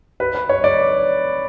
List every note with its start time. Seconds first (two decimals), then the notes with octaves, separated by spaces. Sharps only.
0.20 B4
0.35 B4
0.49 C#5
0.64 D5